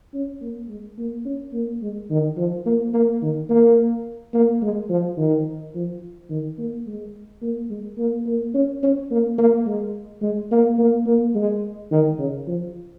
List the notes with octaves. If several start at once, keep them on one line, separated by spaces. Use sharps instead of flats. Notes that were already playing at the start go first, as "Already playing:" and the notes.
C#4
A#3
G#3
A#3
C#4
A#3
G#3
D#3
F3
A#3
A#3
D#3
A#3
A#3
G#3
F3
D#3
F3
D#3
A#3
G#3
A#3
G#3
A#3
A#3
C#4
C#4
A#3
A#3
G#3
G#3
A#3
A#3
A#3
G#3
D#3
C#3
F3